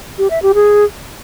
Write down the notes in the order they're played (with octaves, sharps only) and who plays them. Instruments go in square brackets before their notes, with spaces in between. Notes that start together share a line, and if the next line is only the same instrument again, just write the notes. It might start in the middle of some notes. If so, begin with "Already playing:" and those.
[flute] G4
E5
G4
G#4